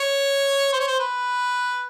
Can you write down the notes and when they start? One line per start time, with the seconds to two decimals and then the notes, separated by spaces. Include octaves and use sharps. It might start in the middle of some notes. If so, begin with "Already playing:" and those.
Already playing: C#5
0.72 C5
0.80 C#5
0.87 C5
0.99 B4